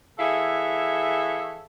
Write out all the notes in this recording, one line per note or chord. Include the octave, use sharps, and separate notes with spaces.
E3 G#4 A4 C#5 E5 F5